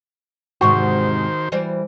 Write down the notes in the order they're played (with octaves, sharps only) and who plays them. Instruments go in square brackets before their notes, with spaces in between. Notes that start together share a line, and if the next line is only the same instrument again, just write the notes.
[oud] E2 G#2 C3 [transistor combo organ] D#3 C5 [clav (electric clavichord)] F#4
[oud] E3 G3 C5